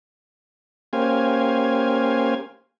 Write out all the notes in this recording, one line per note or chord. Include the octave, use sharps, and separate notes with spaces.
A#3 C#4 G4 C5 F5 G#5